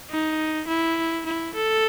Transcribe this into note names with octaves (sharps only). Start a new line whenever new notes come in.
D#4
E4
E4
A4